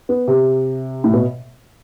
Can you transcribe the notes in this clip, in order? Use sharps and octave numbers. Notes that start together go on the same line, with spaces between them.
B3
C3
A2
B2